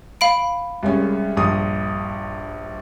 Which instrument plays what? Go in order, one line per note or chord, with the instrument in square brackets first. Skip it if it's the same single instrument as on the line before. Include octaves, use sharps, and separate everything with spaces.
[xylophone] F5 B5 D7
[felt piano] C2 G#3 C#4
A#1 G2 D#6